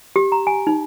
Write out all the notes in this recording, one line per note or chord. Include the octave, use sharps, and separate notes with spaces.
G4
A#5
G#5
D#4